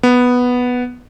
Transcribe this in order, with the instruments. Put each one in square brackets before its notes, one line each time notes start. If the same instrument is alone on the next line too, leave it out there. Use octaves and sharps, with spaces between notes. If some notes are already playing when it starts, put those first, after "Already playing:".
[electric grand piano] B3